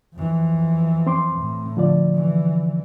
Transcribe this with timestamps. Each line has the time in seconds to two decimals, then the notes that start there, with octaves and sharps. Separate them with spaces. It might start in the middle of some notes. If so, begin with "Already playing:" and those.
0.14 F2 E3
1.07 C4 C6 D6
1.38 A2
1.77 D3 F3 D5
2.15 E3